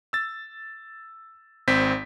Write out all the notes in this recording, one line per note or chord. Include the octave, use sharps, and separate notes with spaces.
E6 A6
G#1 C4 G6 B6